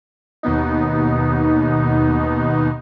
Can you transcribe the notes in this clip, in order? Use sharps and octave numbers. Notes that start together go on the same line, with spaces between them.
D#2 B2 B3 D#4